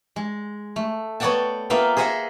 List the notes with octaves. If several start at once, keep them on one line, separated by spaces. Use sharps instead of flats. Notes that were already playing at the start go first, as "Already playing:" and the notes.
G#3
A3
B3 C#5 D5 F#5 G5 A5
A#3 B3 F4 E5 F5 G5
G#4 C5 D#5 E5 F#5 G#5